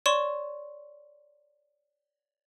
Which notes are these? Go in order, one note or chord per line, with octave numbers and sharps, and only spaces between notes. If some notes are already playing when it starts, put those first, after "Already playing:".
C#5 D5 C6 C#6 E7